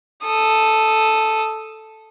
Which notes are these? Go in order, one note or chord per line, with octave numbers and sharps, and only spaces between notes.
A4 D#6